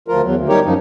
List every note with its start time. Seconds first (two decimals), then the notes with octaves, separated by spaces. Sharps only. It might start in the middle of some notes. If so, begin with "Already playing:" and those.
0.08 D2 F3 F4 A#4
0.23 E2 F#3
0.35 D2
0.49 G3 D#4 G4 A#4 C#5
0.65 F#2 F3 D#4